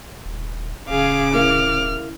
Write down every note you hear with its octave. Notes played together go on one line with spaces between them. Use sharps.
D#1
D1 C#3 G#4 F5 D6
E4 A#4 F5 F6